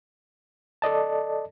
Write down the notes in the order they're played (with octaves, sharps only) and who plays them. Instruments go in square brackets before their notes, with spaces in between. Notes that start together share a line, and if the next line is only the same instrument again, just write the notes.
[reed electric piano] A4 D5 D#5 A5